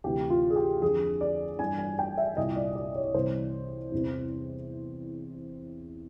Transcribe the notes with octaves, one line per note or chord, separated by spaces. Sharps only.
D2 C3 E3 G4
F4
G#4
G4
F2 D3 G#4
D5
G2 E3 G#5
G#5
G5
E5
C2 A#2 D#5
D5
D5
C#5
C2 C3 E3 C5
E2 C3 E3